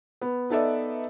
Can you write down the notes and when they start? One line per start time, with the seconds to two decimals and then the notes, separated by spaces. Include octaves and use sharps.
0.22 B3
0.50 B3 D#4 A4 B4 D5 E5